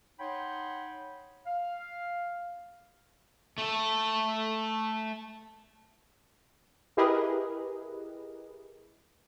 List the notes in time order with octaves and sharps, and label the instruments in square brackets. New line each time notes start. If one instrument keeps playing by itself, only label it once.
[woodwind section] D#4 C#5 F#5 G5 B5 C6
F5
[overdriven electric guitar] A3 A4
[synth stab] E4 G4 G#4 A#4 B4 D#5